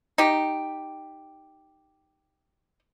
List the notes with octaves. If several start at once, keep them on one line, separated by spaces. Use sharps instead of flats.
D#4 G4